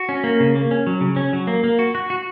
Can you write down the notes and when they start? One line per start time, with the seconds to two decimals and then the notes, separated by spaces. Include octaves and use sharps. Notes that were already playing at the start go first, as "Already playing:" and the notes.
Already playing: F#4
0.09 C#4
0.24 A#3
0.40 C#3
0.55 A#3
0.71 C#4
0.87 F#3
1.01 C#3
1.16 C#4
1.33 F#3
1.47 A#3
1.64 A#3
1.79 F#4
1.95 F#4
2.10 F#4